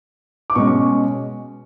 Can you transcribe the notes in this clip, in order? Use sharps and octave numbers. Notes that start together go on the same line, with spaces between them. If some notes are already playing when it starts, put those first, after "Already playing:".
D6
B2 G#3 C#4 C#6